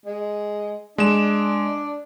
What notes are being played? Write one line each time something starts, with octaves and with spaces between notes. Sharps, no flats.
G#3
G#3 D4 E7